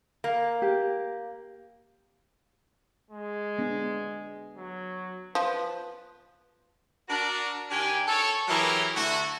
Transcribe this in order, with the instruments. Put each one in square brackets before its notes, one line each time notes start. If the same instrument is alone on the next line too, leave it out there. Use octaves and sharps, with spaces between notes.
[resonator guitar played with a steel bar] A#3
[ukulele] G4
[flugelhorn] G#3
[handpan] B3 D4
[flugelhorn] F#3
[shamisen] F3 [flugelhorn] B4
[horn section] D4 F#4 A#4
D#3 D4 G4 G5 G#5
A4 C#5
E3 F#3 E4 G4 G#4 A#4
D3 A3 E4 F#4